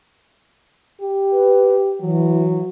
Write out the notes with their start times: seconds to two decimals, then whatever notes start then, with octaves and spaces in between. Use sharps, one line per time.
1.01 G4
1.32 B4
2.01 E3 F#3